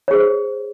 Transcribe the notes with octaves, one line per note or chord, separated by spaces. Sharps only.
G#4 C5 C#5